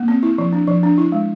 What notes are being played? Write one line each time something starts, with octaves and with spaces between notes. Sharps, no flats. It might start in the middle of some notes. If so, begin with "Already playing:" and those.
Already playing: A#3
C4
E4
F3
D4
F3
D4
E4
G#3